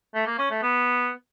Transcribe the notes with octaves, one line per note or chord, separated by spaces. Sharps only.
A3
A#3
C#4
A3
B3